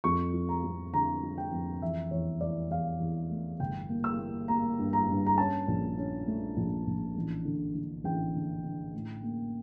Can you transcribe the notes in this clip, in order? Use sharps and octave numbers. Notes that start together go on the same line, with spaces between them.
F2 C#6
F3
A#5
F2
D3 A#5
F3
G5
F2
E3 E5
E2 C#5
E3 D5
E2 F5
E2
A3
G1 G5
A#3
E6
A#3
A#3 A#5
G2
A#5
G2
A#5
C#4 A5
A#1
C#4
A3
A#1
A#1
A1
D3
D3
A1 G5
D3
D3
A2
A#3